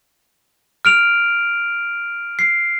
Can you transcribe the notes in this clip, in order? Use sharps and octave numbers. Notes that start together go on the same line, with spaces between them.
F6 D7 F7
C7